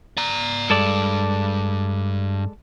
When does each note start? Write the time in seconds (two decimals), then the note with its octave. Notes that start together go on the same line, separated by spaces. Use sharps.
0.17 D5 A#5
0.70 G2 G#3 A4 D5